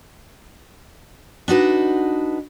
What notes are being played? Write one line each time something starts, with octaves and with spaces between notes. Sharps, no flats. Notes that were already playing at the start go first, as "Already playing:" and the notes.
D4 D#4 F#4 B4